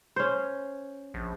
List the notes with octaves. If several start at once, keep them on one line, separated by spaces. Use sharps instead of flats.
C#4 C5
A#1